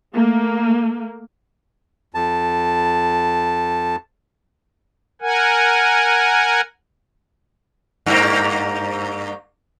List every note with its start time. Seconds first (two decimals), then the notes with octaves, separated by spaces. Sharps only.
0.15 A3 A#3
2.14 F2 A5
5.22 A#4 F#5 G#5
8.06 G2 A#3